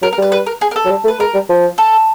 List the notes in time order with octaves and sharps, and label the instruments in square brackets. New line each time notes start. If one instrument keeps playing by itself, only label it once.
[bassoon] F#3 [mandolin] A#4
[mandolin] A#4
[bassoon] G3 [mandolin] B4
[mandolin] B4
A#4
G#4
A#4
A4
[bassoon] F#3
G3
A3
[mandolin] B4
[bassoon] G#3 [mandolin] A#4
[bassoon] G3
F3
[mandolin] A4